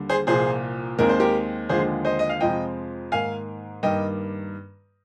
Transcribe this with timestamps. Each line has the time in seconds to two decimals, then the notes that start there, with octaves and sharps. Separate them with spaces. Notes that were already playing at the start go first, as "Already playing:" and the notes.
Already playing: D#2 D3 G3
0.09 G#4 C5
0.27 C2 A#2 F3 G#4 C5
0.98 D#2 D#3 G#3 C4 A#4
1.09 C5
1.20 G4 A#4
1.69 D#2 D3 F3 G#3 G#4 C5
2.05 C5 D#5
2.19 D#5
2.29 F5
2.40 F2 C3 F3 G#3 C4 D#5 G5
3.12 G#2 D#3 A#3 F5 G#5
3.83 G2 D#3 G3 A#3 D#5 G5